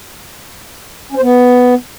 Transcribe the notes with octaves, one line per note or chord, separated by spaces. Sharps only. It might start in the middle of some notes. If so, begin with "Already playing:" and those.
C#4
C5
B3